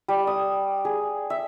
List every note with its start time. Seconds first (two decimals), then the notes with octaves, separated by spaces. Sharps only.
0.08 G3
0.27 D#6
0.85 G#4
1.30 E5